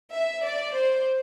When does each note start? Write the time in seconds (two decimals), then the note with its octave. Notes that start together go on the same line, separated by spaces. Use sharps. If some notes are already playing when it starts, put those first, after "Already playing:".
0.13 E5
0.43 D5
0.73 C5